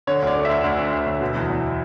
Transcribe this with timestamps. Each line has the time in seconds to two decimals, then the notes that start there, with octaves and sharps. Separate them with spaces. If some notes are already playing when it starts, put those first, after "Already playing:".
0.07 D3 C#5
0.22 D2 D5
0.36 A3
0.45 D2 E5
0.64 D2
0.78 D3
0.93 D2
1.06 D2
1.21 B2
1.35 E2
1.50 E2